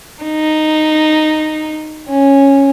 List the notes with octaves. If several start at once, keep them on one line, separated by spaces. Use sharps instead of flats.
D#4
C#4